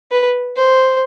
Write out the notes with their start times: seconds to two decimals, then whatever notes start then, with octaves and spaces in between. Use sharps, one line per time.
0.12 B4
0.57 C5